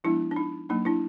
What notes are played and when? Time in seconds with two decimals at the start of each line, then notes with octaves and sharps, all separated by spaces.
0.04 F3 G#3 B3 D4 E4
0.31 D4
0.36 D#4
0.69 F#3 A#3 D4 D#4
0.85 D4 E4